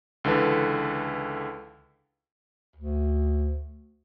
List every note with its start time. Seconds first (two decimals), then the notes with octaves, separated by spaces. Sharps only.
0.24 C#2 D3 E3 A4 B4
2.76 D2